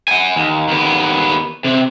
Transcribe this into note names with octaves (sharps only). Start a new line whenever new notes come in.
F#5 G#5
D#2
D#2 B3
C3